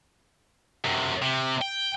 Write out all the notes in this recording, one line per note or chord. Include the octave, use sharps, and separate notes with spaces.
F#2 C3
C3
G5